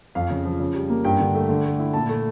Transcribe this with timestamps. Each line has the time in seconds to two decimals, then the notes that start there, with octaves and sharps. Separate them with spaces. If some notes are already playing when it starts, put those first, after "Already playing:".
0.15 F2 F5
0.30 C#3
0.45 F3
0.60 C#3
0.74 G3
0.90 A#3
1.05 G2 G5
1.20 D3
1.35 A3
1.49 D3
1.65 A3
1.79 E4
1.93 A#2 A5
2.09 A3